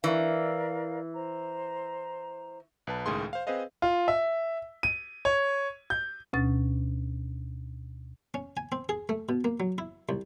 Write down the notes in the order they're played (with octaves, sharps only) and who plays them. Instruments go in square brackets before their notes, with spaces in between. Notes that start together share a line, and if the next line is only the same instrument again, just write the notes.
[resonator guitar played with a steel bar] E3 [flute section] A#4 D5 F5
[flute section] C5 A#5
[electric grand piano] B1 B4 A5
C#2 A2 D#3 G#4 C6
C5 F5
C4 G#4 B4 C5 D#5 F5
[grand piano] F4
E5
D#7
C#5
G6
[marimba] D2 B2 C#4 A6
[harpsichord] C#4
G#5
C4
G#4
A3
B2
A#3
F#3
E4
C2